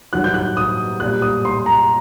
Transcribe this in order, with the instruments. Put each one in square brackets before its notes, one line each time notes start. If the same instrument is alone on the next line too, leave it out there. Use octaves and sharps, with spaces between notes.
[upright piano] G2 D#3 F#3 [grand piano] F#6
[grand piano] G6
F#6
D#6
[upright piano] A#2 G3 A#3 [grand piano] F#6
[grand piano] D#6
C6
A#5